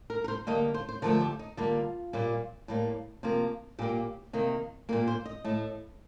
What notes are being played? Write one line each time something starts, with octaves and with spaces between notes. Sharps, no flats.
A#4
A#4
C5
D3 G3 A#3 D#5
C5
C5
D3 F3 A3 A#4
G4
D#4
D3 G3 A#3 F4
A#2 G3 A#3
A2 G3 A#3
C3 F3 A#3
A#2 G3 A#3 G4
C3 D#3 A#3
A#2 G3 A#3 A#4
C5
D#5
A2 A3